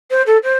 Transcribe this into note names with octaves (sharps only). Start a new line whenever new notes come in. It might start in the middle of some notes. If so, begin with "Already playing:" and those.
C5
A4
C5